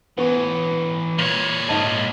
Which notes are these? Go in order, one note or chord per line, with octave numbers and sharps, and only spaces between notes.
E3 B3 C#5
A#2 C#5
G#2 D#4 D#5 F5 A5